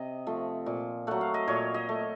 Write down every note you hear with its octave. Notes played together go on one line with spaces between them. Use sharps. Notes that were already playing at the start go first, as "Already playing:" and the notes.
Already playing: C3 D#5
F3 A3
A#2
F#3 A3 F#5
F5
D#5
A#2 C#5
D#5
A3